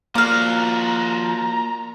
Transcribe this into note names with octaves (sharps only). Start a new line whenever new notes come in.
F3 A#3 F#4 D5 F5 A#5